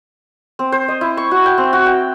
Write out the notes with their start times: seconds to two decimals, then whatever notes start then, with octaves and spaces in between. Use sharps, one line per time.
0.59 C4
0.72 C5
0.88 D#5
1.01 E4
1.17 C#6
1.31 F#4
1.46 G5
1.58 C4
1.73 F#4
1.86 G5